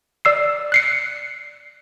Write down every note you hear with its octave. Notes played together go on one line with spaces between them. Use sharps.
D5 E6 C7
F#6 C7 C#7